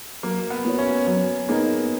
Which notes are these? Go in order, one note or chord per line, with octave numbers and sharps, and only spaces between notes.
F#3 A#3
B3
B3 F#4 C#5
C#4
F#3 C#4
A#3 B3 D#4 G#4